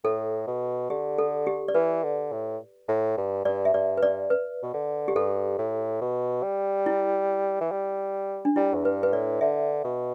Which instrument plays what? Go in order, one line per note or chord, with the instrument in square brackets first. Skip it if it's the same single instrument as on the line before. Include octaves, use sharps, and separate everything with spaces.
[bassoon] A2 [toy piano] A4
[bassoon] B2
[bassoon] D3 [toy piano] G4
[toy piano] A4
G4
D5
[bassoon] E3 [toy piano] B4
[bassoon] D3
A2
A2
G2
[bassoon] G2 [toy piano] D5
[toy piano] E5
[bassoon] G2 [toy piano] D5
[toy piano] B4
[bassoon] G2 [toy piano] D5
[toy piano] B4
[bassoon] B2
D3
[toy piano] G4
[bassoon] G2 [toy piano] A4
[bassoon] A2
B2
G3
[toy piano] E4
[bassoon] E3
G3
[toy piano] D4
[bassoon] G3 [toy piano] E4
[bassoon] E2
[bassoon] G2 [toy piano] B4
[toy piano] B4
[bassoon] A2 [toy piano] D5
[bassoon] D3 [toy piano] E5
[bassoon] B2